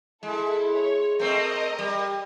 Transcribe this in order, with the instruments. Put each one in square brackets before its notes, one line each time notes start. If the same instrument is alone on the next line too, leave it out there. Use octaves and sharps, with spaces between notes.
[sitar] G#3 [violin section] E4 A4
[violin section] C#5
[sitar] A3 C4 [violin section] A#4 D#5
[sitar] G3